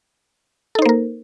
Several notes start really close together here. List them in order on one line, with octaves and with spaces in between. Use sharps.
A4 D#4 C5 A#3 A#4